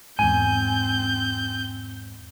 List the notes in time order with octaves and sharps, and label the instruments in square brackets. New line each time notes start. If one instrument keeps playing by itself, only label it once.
[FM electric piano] E2 G#2 [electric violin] C4 G6 [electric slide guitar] G#5